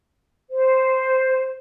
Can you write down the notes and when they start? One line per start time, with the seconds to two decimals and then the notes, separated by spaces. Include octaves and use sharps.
0.50 C5